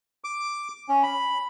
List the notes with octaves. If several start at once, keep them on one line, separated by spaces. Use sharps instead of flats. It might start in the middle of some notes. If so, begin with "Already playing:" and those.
D6
C#4
B5